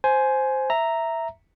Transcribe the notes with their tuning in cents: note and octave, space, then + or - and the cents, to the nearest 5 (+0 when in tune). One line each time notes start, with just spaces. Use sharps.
C5 +0 G#5 +15
E5 +0 A#5 -5